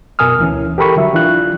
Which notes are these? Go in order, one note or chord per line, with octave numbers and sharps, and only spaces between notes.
F#2 B2 A#4 G#5 D#6 F6
D2 E3 C#4
G4 A4 A#4 G5 B5 C#6
D3 F#3 E5
E3 D4 F4 F#6